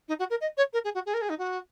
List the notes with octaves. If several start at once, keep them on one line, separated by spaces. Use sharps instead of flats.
D#4
F#4
A#4
D#5
C#5
A#4
G#4
F#4
G#4
A#4
G#4
D#4
F#4